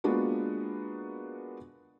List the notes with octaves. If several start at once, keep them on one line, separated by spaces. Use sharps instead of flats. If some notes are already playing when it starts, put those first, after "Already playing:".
G#3 A#3 B3 D4 F4 F#4